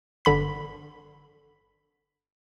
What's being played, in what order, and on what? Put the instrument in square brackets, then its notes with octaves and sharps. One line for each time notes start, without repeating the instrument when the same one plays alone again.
[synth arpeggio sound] G1 D3 B5 B6